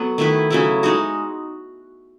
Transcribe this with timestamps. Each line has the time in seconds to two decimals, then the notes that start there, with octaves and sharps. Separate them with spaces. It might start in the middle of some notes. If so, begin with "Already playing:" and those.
Already playing: F#3 B3 A4
0.18 D#3 A3 E4 B4
0.50 C#3 F#3 A3 E4
0.83 G#3 D#4 F#4